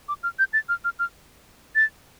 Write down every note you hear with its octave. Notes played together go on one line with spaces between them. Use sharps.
D6
F6
G6
A6
F6
F6
F6
A6